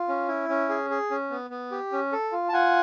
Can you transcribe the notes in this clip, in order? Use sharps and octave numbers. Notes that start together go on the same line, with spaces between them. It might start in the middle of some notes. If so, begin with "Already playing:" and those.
Already playing: F4
C#4
E4
C#4
G#4
G#4
C#4
B3
B3
G4
C#4
A4
F4
A5
F4 F#5 G#5